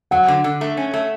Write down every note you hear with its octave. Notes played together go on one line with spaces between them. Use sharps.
F#3 F#5
D3
D3
A3
C#4
A3